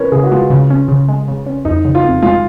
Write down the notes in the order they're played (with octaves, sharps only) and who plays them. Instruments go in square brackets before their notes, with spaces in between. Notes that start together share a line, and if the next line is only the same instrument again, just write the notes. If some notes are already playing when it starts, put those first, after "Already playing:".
Already playing: [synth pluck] C#4 [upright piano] A#4 B4 C#5
[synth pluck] C#3 [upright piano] G#4
[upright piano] F#4
[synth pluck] G#3 [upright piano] F4
[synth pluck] C#3
C#4
C#3
G#3
C#3
C#4
[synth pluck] F2 [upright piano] D#4
[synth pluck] C#3
[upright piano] F4
[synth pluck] F2
[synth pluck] G#3 [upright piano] F4